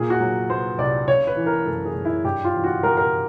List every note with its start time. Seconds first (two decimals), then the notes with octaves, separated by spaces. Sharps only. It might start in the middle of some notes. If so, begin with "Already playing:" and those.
Already playing: A#2 G#4
0.10 F#4
0.20 F#3
0.50 B3 C5
0.78 C2 D5
1.07 C#3 C#5
1.27 B4
1.36 E3
1.46 A#4
1.66 F#2 A4
1.85 G#4
1.95 F#2
2.05 E4
2.24 G2 G4
2.45 F4
2.54 E3
2.64 F#4
2.83 G3 A#4
2.97 A#4